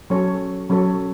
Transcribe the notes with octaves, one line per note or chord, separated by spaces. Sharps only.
F#3 C#4 A4 C#5
F#3 C#4 A4 C#5